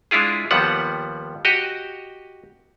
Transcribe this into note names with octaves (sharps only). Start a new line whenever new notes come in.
G#3 D4 E4 F4 G#4
D#2 F3 G3 B3 F#5
F#4 G4 D#5